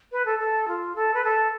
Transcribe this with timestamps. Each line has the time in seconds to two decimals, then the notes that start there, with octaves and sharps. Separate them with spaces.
0.12 B4
0.25 A4
0.39 A4
0.67 F4
0.95 A4
1.14 B4
1.24 A4